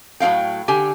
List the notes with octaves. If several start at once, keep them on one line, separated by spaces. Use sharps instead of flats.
A2 F#3 C4 F5 G5
D3 G4 G#5